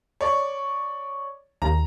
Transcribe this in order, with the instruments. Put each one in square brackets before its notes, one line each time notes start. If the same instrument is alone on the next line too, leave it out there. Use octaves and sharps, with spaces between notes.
[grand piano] C#5 D5
[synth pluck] D#2 [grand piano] A#5